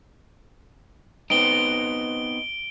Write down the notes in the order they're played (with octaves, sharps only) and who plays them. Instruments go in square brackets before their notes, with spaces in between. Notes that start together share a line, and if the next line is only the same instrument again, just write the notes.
[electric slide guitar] B3 C4 D#4 [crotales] D7 G7